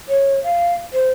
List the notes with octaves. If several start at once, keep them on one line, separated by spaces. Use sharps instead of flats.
C#5
F5
C5